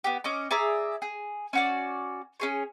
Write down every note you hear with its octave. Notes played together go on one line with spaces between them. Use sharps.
B3 G4
C#4 D#5 D6
G#4 D5 E5 A#5
G#4
C#4 F#4 D5
C#4 G#4 C#5